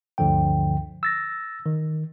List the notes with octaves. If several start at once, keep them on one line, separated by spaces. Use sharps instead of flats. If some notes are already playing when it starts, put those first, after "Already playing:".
D2 G2 D3 F3 G5
E6 A6 A#6
D#3